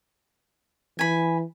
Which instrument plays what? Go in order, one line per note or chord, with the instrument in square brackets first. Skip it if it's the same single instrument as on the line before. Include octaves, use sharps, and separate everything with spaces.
[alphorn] E3 [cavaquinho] G#5 B5